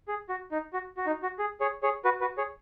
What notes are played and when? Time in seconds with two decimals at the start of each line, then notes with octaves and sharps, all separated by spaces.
0.08 G#4
0.29 F#4
0.51 D#4
0.73 F#4
0.97 F#4
1.07 D#4
1.23 F#4
1.39 G#4
1.60 G#4 C#5
1.83 G#4 C#5
2.05 F#4 B4
2.21 F#4 B4
2.38 G#4 C#5